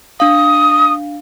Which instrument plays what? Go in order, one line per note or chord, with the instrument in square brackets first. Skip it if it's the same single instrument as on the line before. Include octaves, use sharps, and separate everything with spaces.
[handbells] D4 F5 [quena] D#6